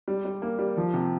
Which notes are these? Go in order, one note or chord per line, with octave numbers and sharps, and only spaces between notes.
G3
G3
A#3
G3
F3
C3